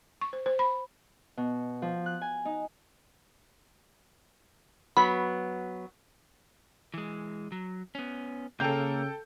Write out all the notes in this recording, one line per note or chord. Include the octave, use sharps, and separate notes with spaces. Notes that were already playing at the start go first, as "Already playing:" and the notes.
C#6
C5
C5
B5
B2
F3
F#6
G#5
D#4
F#3 B3 B5
E3 G#3
F#3
B3 C#4
C#3 A#3 A4 A#4 G5 G6